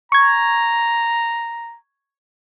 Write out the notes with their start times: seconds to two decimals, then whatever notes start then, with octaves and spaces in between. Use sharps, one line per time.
0.12 A#5 C#6 G#6